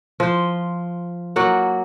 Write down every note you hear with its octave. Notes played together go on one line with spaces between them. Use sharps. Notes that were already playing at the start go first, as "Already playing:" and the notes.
F3 C5
F#3 A#3 F#5